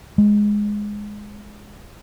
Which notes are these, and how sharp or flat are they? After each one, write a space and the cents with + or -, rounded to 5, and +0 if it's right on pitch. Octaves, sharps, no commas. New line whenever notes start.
G#3 +0